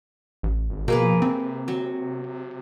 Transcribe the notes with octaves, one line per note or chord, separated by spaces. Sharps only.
A1
G#1
B2 F3 A#3 G#4 B4
C3 C4
F#3